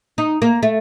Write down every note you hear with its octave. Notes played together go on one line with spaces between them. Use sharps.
D#4
A#3
A3